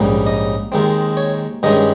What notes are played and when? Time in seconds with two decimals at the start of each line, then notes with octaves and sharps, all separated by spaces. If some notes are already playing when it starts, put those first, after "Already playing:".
Already playing: A#1 G#2 G3 A#3 C#4
0.27 D#5
0.72 D#2 D#3 G#3 C4
1.17 C#5
1.63 G2 D#3 G#3 C#4 D#5